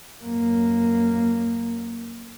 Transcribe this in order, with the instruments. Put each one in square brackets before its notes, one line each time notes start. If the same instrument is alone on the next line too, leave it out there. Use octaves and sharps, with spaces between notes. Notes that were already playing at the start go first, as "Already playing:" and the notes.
[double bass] F#2 A#3